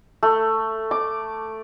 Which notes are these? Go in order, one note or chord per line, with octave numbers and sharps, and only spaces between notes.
A3
D6